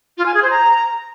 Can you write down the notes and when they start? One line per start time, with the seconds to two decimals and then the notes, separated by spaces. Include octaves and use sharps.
0.18 F4
0.26 G#5
0.34 G#4
0.42 C5
0.51 A#5